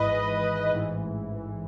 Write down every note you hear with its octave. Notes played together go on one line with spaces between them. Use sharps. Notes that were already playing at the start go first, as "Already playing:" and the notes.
Already playing: G#1 G#2 E3 B4 D#5
A1 G#2 E3